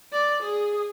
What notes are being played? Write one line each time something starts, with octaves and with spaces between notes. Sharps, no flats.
D5
G#4